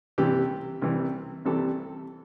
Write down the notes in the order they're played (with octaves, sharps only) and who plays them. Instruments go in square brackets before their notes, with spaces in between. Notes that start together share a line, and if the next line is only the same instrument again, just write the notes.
[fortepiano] C2 C3 E3 G3 G4
C2 C3 E3 G3
C2 C3 E3 G3 A4